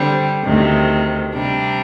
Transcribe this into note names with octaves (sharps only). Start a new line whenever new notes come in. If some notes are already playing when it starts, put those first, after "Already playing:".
Already playing: D3 G3 C4
D2 C3 D#3
C3 G3 D4